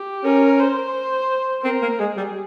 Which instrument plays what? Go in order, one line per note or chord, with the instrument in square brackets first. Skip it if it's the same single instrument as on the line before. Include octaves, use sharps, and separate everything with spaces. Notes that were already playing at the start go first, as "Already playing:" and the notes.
Already playing: [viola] G4
[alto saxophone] C#4 [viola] A#4
[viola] C5
[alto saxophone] C4 [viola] A#4
[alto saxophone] A#3
[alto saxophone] G#3 [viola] G#4
[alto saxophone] G3